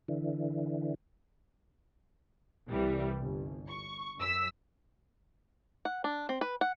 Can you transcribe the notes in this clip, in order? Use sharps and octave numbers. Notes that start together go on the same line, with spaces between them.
D3 E3
C2 E3 G3
G1
C#6
F#2 E6 B6
F#5
D4
C4
B4
F#5